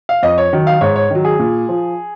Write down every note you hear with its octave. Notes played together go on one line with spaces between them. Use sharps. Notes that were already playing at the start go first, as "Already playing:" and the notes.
F5
F2 D#5
C#5
D#3 F#3
F5
G#2 C#5
C#5
D#3 F#3
G#4
A#2
F3